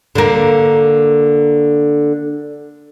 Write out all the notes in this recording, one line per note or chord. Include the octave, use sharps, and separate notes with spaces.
D3 A#3